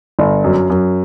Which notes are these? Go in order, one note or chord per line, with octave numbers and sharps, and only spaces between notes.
G1
F#2
F#2